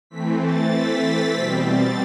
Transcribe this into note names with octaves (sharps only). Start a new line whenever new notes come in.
E3 A3 C4 B6
A6
B6
A6
B2 G3 C4 B6
A6